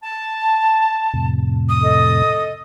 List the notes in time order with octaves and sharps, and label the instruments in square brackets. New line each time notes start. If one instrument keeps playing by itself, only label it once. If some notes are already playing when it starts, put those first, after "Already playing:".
[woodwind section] A5
[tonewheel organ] F2 A2 C3
[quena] D#6
[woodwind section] A4 D#5